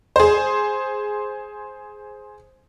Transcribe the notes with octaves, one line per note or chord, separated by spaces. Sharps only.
G#4 C5